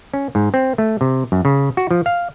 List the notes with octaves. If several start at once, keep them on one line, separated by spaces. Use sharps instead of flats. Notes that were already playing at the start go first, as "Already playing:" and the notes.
C#4
G#2
C4
A3
C3
F#2
C#3
F#4
F3
F5